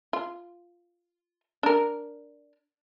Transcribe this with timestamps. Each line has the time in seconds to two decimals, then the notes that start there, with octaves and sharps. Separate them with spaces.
0.13 F4
1.63 D4 A#4